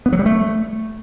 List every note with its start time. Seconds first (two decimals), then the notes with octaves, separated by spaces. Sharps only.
0.06 B3
0.13 F#3
0.19 G3
0.26 A3